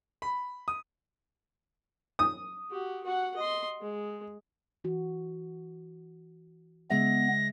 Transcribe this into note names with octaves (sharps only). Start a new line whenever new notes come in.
B5
D#6
D#6
F#4 G4
F#4 F#5
D#5 C6
G#3
E3 F#4
C#3 G#3 B3 E5 A#6